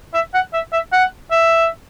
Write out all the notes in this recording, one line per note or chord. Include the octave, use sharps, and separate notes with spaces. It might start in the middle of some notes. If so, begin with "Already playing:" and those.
E5
F#5
E5
E5
F#5
E5